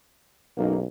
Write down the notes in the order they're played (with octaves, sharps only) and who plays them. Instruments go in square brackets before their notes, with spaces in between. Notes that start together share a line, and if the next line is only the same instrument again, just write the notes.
[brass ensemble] F#1 A#3 D#4 [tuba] B1